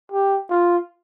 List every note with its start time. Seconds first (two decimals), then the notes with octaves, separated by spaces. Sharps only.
0.12 G4
0.50 F4